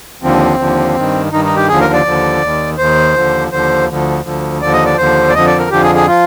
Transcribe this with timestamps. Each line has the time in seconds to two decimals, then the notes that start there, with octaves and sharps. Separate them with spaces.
0.23 D#2 D3 F3 C4
0.59 D#2 D3 F3
0.96 G2 D#3
1.32 G2 D#3 D#4
1.45 D#4
1.56 G4
1.68 D#2 D3 F3 G#4
1.81 A#4
1.93 D5
2.05 D#2 D3 F3
2.42 D#2 D#3
2.78 D#2 D#3 C5
3.15 D#2 D3 F3
3.51 D#2 D3 F3 C5
3.88 D2 D3 F3
4.25 D2 D3 F3
4.61 D#2 D3 F3 D5
4.73 D#5
4.86 D5
4.98 D#2 D3 F3 C5
5.29 D5
5.34 F2 D3 F3 D#5
5.47 D5
5.58 A#4
5.71 F2 D3 F3 G4
5.83 G#4
5.95 G#4
6.08 F3 F4